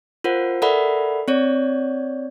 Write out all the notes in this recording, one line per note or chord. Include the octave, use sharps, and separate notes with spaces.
F4 A#4 C5 F#5
A4 A#4 D5 E5 F#5 B5
C4 C#5 D5